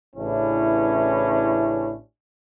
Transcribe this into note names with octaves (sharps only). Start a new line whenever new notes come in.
A1 C#3 E3 C#4 D4 E4